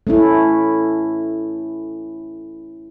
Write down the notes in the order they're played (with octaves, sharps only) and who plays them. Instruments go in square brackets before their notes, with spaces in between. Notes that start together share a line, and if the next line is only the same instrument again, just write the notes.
[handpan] A3 C#4 E4